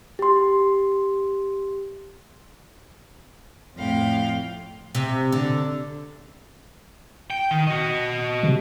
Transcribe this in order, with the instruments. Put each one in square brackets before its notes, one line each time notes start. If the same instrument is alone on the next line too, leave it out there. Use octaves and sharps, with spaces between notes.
[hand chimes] G4 C6
[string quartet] F2 A2 F5 G5
[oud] C3
D3
[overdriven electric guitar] G5
D#3
F#4 D#5
[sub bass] C3